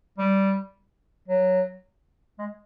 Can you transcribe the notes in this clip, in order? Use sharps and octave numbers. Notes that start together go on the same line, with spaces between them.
G3
F#3
G#3